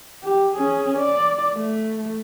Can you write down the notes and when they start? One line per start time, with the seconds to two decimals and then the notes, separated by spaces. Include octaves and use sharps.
0.24 G4
0.56 C#4 G#4
0.98 D5
1.54 A3